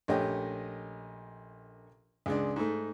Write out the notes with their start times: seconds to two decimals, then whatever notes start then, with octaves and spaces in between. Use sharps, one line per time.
0.08 A#1 A3 C#4 G4 D#5
2.26 C#2 G#3 D4
2.56 G#2 A3